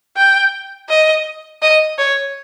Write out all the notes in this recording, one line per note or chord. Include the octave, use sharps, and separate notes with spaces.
G5
D#5
D#5
C#5